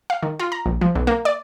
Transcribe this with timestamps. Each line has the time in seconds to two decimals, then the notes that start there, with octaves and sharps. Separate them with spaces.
0.10 F5
0.23 D#3
0.39 F4
0.52 A#5
0.66 A#1
0.81 F3
0.95 B1
1.07 A#3
1.25 D5